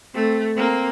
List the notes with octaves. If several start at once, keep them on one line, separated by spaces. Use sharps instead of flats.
A3 C4
A#3 C4